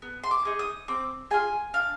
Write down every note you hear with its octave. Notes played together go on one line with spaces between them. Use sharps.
B3
C6
D6
D#4 G#4
D#6
C4 D6
F4 G#4 G#5
D4 F5